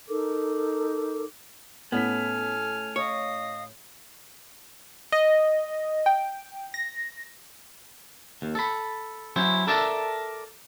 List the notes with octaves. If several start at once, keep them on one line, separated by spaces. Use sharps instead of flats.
D#4 A4 A#4 D6
A2 B3 C#4 A4 G#5 F6 B6
C#5 D#5 F5 D#6
D#5
G5
A#6
D#2
A4 B5
F#3 C#4 E4 C5
A4 A#4 D5 E5 A5